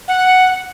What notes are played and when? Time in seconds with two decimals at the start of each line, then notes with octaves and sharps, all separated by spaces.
0.08 F#5